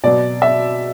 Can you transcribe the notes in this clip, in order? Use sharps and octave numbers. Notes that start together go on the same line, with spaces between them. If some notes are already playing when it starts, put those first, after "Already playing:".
B2 F#3 D5
E5